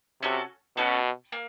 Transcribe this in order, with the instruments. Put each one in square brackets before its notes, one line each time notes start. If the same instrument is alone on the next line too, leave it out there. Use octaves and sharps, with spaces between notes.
[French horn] C3 [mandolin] C#4 F#4 A4
[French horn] B2 [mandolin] C#4 F#4 A4
[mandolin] A#3